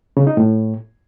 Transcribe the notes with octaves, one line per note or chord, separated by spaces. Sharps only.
C#3
D#4
A2